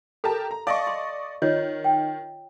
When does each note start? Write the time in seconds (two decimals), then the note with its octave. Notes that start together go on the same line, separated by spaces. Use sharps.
0.24 G4 A4 A#4 A5
0.51 A#5
0.67 D5 D#5 F5 A5 C#6 D6
0.87 C6
1.42 D#3 F4 C#5 D#5
1.84 G5